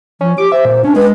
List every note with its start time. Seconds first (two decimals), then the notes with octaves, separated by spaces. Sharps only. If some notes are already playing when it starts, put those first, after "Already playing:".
0.21 F3 C#4
0.38 G4 D6
0.52 C5 E5
0.65 A#2
0.84 C#4 D4
0.96 G#3 B4